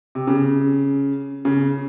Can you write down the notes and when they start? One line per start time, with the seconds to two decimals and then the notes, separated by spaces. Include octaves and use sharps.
0.15 C3
0.27 C#3
1.45 C#3